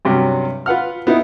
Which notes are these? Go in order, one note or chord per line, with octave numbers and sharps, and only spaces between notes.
G2 C3 F#3 C#4
F4 B4 F#5 F6
B3 D#4 E4